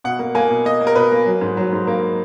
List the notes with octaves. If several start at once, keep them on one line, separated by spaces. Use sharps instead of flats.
B2 F#5
A#3
A#3 G#5
B2
A#3 D#5
A#3
A#4
B2 B4
A#3
F#3
G#2
F#3
G#2
A#3